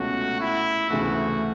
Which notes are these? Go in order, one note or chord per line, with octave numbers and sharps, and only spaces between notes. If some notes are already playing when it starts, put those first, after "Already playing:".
Already playing: C#2 B2 A3 C#4 F#4
E4
D2 C#3 E3 A3 F#4